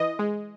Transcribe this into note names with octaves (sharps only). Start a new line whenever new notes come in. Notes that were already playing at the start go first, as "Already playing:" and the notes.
Already playing: E3 D#5
G#3